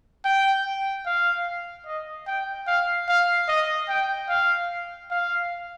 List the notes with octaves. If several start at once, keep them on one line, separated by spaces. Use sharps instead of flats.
G5
F5
D#5
G5
F5
F5
D#5
G5
F5
F5